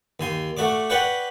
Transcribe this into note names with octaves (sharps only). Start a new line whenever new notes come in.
D#2 G#5 C6
A3 F#4 D5 D6
F#4 B4 D5 F#5 G5